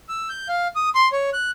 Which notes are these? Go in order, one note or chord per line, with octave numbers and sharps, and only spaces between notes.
E6
G6
F5
D#6
C6
C#5
F#6